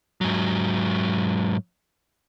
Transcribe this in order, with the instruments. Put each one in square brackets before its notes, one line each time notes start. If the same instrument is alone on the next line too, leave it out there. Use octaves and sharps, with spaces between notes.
[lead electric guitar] G#2 F#3